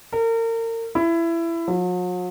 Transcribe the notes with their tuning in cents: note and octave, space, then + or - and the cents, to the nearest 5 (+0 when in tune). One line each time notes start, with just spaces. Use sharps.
A#4 -35
E4 +20
F#3 -45